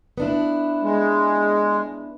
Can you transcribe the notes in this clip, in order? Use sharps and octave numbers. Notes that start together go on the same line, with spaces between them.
B3 D4 E4
G#3